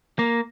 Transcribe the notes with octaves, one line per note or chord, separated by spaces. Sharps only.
A#3